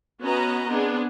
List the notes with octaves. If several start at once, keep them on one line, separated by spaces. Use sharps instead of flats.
B3 C#4 F#4 B4 D#5 A#5
B3 C4 D4 G#4